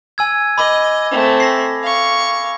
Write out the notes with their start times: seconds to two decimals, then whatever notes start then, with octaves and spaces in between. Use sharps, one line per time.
0.18 G#5 E6 G#6
0.58 D#5 B5 D6
1.11 A3 C4
1.40 A#6 C7
1.82 F5 C#6